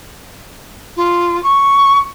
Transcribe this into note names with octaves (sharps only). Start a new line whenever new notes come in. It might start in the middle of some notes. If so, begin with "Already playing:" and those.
F4
C#6